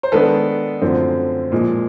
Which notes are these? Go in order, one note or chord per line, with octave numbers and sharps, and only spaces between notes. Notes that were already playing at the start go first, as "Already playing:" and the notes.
C5
D#3 G#3 B3 D4 A4 B4
F#2 D3 F3 A3 C4
A#2 F3 G#3